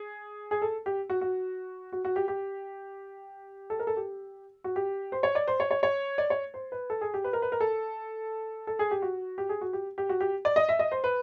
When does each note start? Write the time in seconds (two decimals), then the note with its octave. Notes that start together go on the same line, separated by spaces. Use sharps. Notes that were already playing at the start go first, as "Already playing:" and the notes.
Already playing: G#4
0.51 G#4
0.62 A4
0.86 G4
1.10 F#4
1.21 F#4
1.92 F#4
2.05 F#4
2.16 G4
2.28 G4
3.70 A4
3.79 A#4
3.87 A4
3.97 G4
4.64 F#4
4.76 G4
5.12 C5
5.23 C#5
5.35 D5
5.48 C5
5.60 C#5
5.71 C#5
5.83 C#5
6.18 D5
6.30 C#5
6.54 C5
6.72 B4
6.90 A4
7.01 G#4
7.14 G4
7.24 B4
7.33 A#4
7.42 B4
7.52 A#4
7.60 A4
8.67 A4
8.79 G#4
8.91 G4
9.02 F#4
9.38 G4
9.49 G#4
9.61 F#4
9.73 G4
9.98 G4
10.09 F#4
10.20 G4
10.45 D5
10.56 D#5
10.69 E5
10.79 D#5
10.92 C5
11.04 B4